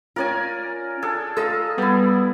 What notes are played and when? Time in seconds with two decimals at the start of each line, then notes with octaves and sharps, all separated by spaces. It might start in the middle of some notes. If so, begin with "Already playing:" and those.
0.16 C#4 F4 A#4 D5 G#5
1.03 D4 G#4 A4
1.37 F4 A4 D#5 F5 A#5 E6
1.78 G3 B3 E4 D5